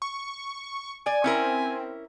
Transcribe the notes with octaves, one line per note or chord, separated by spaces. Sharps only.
C#6
D5 G#5
C4 C#4 E4 A#4